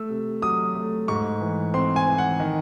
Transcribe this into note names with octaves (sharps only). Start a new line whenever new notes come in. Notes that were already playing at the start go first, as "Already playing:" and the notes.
Already playing: A3 E6
C3
F#3 D#6
A3
G#2 C#6
E3
C4 C6
G#5
E3
F#5
D#3